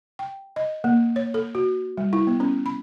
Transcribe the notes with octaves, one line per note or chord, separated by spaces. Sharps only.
G5
D#5
A#3
C#5
A4
F#4
G3
E4
B3
C#4
B5